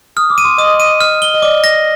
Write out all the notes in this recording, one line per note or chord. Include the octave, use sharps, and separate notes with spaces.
D#6 F6
D6
D#7
C6
D#5 D#6
D#7
F6
G7
D#5
D5 D6
A#6